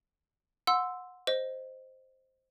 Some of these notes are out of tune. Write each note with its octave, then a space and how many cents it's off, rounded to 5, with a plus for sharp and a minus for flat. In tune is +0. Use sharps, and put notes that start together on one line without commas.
F#5 -20 C6 -10 E6 +0
C5 +0 D#5 +0